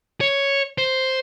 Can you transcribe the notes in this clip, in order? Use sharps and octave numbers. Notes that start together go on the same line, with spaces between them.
C#5
C5